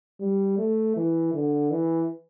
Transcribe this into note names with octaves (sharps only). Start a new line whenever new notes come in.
G3
A3
E3
D3
E3